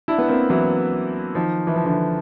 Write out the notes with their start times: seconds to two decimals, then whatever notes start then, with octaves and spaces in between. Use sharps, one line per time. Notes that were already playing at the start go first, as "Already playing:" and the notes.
0.08 D4 E4
0.18 B3
0.28 A#3 C4
0.50 E3 F#3
1.35 D#3 F3
1.67 E3
1.76 F3
1.85 D3 E3